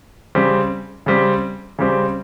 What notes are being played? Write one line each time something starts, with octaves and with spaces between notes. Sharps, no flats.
C#3 G3 C4
C#3 G3 C4
C#3 G3 C4